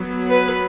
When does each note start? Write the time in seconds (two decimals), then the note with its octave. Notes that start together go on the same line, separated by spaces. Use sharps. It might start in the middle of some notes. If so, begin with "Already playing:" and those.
Already playing: F#3 B3
0.30 B4